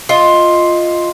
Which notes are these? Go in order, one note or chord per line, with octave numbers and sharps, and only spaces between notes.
F4 D#5